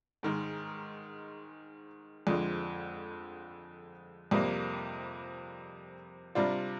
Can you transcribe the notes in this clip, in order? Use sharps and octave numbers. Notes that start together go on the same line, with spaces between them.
G#2 D#3 G#3
F2 D3 F3 G#3
F2 C3 G3 A#3
C3 G3 D4 F4